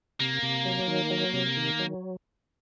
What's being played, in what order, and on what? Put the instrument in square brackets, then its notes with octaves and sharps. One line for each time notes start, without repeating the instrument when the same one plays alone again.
[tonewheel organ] C3 [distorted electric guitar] A#3
[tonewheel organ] C3
F#3
D#3
F#3
C3
D#3
F#3